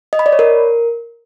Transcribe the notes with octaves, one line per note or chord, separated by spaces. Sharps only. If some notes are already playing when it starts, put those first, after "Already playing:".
D#5
B5
D5
C#5
A#4